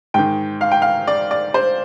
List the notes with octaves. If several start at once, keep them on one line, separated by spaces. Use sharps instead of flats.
G#2 D#3 G5
F5
G5
F5
D5
D5
C5